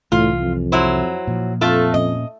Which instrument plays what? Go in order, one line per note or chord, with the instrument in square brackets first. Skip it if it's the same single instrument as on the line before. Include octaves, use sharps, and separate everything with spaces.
[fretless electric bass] C2 E3 [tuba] A2 [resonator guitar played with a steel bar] F4
[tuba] F2
[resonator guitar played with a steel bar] F#3 E4 C5
[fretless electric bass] A#2 F3
[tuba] F2 [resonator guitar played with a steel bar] A3 F4 A4
[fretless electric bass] A#2 C#4 [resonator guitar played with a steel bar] D#5